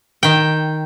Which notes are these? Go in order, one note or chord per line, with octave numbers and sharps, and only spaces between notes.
D#3 G5